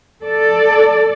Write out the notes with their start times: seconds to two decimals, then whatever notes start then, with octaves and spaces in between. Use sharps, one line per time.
0.24 A4 D5